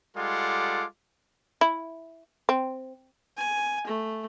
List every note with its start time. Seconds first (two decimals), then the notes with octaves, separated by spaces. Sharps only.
0.17 G3 G#3 F4 A4 F#5 D6
1.61 E4
2.49 C4
3.37 G#5
3.87 A3